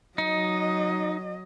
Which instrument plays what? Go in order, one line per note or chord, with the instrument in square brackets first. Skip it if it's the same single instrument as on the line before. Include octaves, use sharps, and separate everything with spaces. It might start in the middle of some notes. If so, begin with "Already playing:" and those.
[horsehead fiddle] F#3 D#5 [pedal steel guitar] D#4